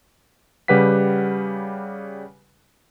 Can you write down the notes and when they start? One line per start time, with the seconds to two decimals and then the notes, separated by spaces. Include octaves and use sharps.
0.68 C#3 G3 G4 B4 F#5 B6